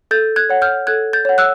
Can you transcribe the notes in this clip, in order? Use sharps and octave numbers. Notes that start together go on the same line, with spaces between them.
A4 G6 A6
F#6 G#6
C#5 F#5
F6 G6
A4 F#6 G#6
G6 A6
C#5 F#5
E6 F#6